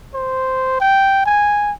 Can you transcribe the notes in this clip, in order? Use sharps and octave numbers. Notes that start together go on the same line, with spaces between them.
C5
G5
G#5